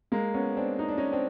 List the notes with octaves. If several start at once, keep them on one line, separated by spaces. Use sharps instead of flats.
G#3 A#3
B3 C#4
C4 D4
D#4
D4
C#4 D#4
C4 D4